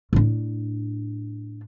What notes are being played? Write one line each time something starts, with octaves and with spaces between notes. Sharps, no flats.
A2 D4